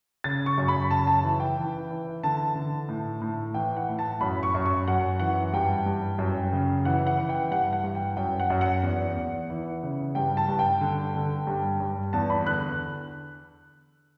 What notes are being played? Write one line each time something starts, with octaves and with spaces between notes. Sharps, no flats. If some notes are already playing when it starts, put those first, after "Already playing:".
C#3 A6
C#6
F#2
B5
C#3 A5
A5
E3
G5
E3
E3
D3 A5
D3
A2
A2
E3 G5
F#5
A2
A5
F#2 B5
C#6
F#2
C#6
F#2 F#5
E3 F#5
G2 G5
G2
F#2
C#3
E3 F#5
F#5
E3
G5
G2 F#5
F#5
G2
G5
F#2 G5
F#5
F#2
F#5
E2
E2
E3
C#3
G2 G5
A5
G2
G5
D3
D3
G2
G2
E2 A5
B5
D3 F#6